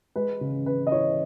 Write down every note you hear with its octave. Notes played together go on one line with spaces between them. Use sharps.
G#3 B4
C#3
C#3 B4
D#5
E3 C#5